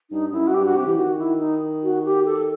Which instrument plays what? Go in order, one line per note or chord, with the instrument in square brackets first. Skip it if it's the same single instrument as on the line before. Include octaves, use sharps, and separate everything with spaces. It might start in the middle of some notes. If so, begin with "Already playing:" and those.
[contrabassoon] G2 [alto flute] D#4
[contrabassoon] F#2 [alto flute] E4
[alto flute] F#4
[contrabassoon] G2 [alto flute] G4
[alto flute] F#4
[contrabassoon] C3 [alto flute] G4
[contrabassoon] E3
[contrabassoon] D#3 [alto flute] F#4
[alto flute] E4
D#4
F#4
G4
A4